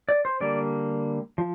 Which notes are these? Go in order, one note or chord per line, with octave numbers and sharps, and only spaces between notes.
D5
C5
D3 G3 A#3 D5
F3